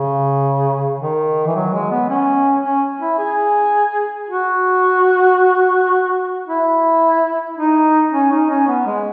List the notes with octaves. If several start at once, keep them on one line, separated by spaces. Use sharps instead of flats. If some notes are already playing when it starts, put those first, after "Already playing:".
Already playing: C#3
D#3
E3
F#3
G#3
B3
C#4
C#4
E4
G#4
F#4
E4
D#4
C#4
D#4
C#4
B3
G#3